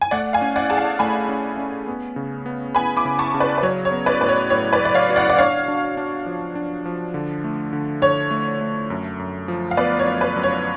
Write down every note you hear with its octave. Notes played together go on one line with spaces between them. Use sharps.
G#5
A3 D5 F#5
F5 G#5
C#4
D5 F#5
G#4 A5
F5 G#5
A3 G#5 B5
C#4
C#4
B3
C#3
B3
B3 G#5 B5
B5 D6
C#3
A5 C#6
C#3
B4 D5
B4
F#3 C#5
C#5
B3
B4 D5
A2 B4
C#5
A2 C#5
B4 D5
A2
D5
C#5 F5
F#4
D5 F#5
D5
D4 C#5 F5
D4
D4
F3
D4
F3
D3
A3
D3
D3 C#5
A3
A3
F#2
F#2
F3
F5
B3 B4 D5
C#5
F#2
B4
F#2
C#5